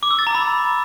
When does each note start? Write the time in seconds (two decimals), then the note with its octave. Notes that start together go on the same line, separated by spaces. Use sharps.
0.03 D6
0.11 E6
0.19 A6
0.27 A#5
0.35 B5